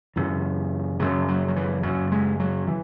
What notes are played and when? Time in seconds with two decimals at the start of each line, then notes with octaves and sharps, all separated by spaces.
0.16 F#2 C#3 E3
1.00 F#2 C#3 F#3
1.28 F#3
1.48 F#3
1.56 E3
1.83 F#2 C#3 F#3
2.12 G#3
2.40 F#3
2.67 E3